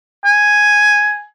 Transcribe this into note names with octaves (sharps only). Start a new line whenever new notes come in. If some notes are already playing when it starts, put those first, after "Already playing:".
G#5